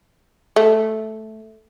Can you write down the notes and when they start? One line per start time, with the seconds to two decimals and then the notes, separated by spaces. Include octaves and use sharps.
0.56 A3